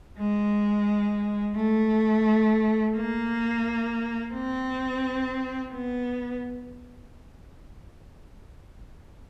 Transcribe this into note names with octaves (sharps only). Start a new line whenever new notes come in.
G#3
A3
A#3
C4
B3